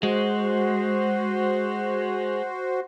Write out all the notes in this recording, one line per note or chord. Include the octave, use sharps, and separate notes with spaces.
G#3 F#4 C5